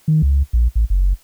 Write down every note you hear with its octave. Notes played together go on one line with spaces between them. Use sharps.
D#3
C#2
A#1
A1
F#1